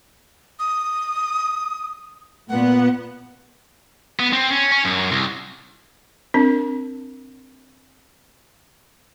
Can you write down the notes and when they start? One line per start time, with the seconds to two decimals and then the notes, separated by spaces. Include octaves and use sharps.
0.59 D#6
2.49 A#2 B3 F#5
4.20 B3
4.33 C4
4.50 C#4
4.72 C#4
4.85 F#2
5.12 C2
6.34 C4 D4 A#4